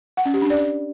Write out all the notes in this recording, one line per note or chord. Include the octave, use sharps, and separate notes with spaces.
F#5
C#4
G4
D4
D5